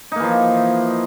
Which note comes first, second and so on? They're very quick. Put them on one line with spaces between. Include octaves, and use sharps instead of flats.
D#4 A#3 E3 F3